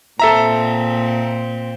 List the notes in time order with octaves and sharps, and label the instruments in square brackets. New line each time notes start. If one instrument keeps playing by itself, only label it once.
[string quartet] A#2 C4 [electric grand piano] A4 E5 A#5